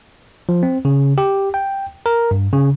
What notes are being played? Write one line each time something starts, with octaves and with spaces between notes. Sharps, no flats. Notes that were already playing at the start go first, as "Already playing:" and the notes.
F3
C4
C#3
G4
G5
A#4
G2
C#3